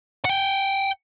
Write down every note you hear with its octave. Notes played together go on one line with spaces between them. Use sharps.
F#5 G5